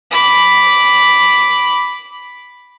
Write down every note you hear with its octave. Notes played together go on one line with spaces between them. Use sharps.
B5 D6